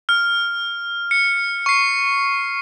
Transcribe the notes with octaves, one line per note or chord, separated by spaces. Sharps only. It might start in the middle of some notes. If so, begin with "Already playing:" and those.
F6
C#7
C#6 C7